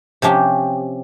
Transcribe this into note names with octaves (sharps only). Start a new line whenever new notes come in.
C3 F3 C#4 G4